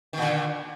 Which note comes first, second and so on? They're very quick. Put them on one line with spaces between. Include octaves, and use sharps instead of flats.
D#3 A#2 D3